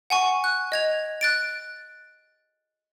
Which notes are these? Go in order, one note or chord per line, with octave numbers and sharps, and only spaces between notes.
F#5 G#5 C#6
F#6
D#5 G#6 F7
F#6 A6 D7